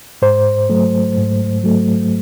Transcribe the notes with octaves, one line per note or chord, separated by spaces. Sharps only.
G#2 C5
F#3 A3
G#2
F#3 A3